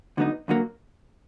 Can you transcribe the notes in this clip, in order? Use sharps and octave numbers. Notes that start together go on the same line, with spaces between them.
D2 D3 F#3 B3 D#4
D#2 D3 F#3 A#3